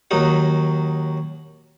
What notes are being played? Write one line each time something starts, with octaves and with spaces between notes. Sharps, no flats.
D#2 F#3 D#4